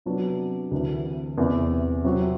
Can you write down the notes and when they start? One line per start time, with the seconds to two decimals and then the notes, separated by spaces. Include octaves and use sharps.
0.06 C3 F#3 B3 D4
0.71 D2 C3 E3
1.38 E2 C3 E3
2.04 C3 F#3 C4 F#4